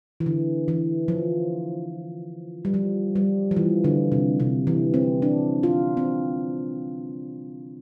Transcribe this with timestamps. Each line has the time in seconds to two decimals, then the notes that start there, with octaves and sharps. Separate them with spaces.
0.20 E3
0.26 D3
0.68 E3
1.08 F3
2.65 G3
2.74 F3
3.16 G3
3.51 F3
3.56 E3
3.84 D3
4.12 C3
4.40 C3
4.67 E3
4.94 C4
5.22 D4
5.63 F4
5.97 C4